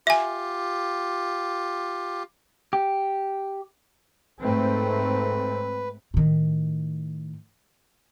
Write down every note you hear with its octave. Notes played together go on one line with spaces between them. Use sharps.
F4 G4 E5 G#5
G4
G#2 A3 C4 B4
A2 D#3